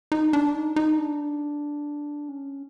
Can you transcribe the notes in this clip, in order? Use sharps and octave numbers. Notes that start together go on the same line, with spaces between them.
D#4
D4
D#4
D#4
D4
C#4